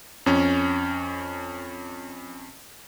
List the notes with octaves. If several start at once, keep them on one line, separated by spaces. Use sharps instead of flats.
F2 C#4